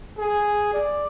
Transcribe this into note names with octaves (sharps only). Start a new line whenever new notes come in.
G#4
D5